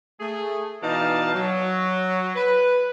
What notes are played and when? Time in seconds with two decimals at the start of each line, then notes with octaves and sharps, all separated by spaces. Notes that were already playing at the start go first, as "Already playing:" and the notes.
0.21 A3 G#4
0.83 B2 E3 D#4 D5 F5 A5
1.34 F#3
2.36 B4